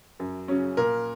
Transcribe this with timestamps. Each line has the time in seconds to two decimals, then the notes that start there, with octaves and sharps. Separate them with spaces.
0.20 F#2
0.48 C#3 F#3 C#4
0.77 A#2 A#4